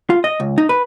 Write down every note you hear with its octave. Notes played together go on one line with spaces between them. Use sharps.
F4
D#5
C#2
D#4
B4